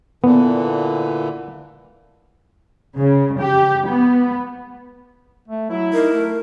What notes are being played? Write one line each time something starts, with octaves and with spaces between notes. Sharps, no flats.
A#2 D3 E3 B3
C#3
G4
B3
A3
F#3 E4
D#4 A#4
A3